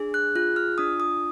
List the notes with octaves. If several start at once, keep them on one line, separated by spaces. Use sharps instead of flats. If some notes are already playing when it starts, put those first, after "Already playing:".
Already playing: D4 G#4
F#6
F4 F#6
F6
D4 D#6
D#6